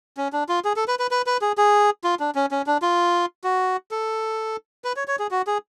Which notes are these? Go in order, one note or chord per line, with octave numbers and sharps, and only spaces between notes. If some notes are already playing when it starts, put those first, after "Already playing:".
C#4
D4
F4
G#4
A4
B4
B4
B4
B4
G#4
G#4
F4
D4
C#4
C#4
D4
F4
F#4
A4
B4
C#5
C#5
G#4
F#4
G#4